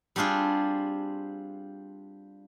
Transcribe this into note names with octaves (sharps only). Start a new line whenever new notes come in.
G3 C4 D4 F4 G#4